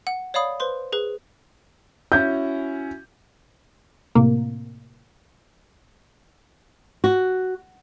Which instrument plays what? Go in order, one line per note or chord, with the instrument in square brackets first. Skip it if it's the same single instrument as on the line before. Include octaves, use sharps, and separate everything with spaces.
[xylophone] F#5
C#5 D5 F5 B5 D#6
B4 C5 C6
G#4 B4
[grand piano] C#4 E4 F#4 [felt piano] G6
[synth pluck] A2 C3 A#3
[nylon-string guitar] F#4